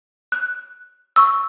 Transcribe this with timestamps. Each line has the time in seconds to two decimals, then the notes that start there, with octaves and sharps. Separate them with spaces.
0.32 F#6
1.16 C#6 E6